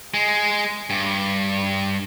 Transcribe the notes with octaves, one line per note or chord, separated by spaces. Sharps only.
G#3
G2